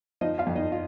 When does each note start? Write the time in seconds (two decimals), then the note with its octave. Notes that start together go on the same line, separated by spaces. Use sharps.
0.21 F3 D#4 D#5
0.38 F4 F5
0.47 F2
0.55 D#4 D#5
0.72 F4